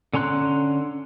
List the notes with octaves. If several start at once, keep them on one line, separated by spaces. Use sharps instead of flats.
D3 C#4 A#5 C6 F#6